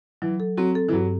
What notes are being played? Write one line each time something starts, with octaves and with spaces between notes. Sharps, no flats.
E3 F#3
A4
F#3 C4
A4
E3
G2 F#3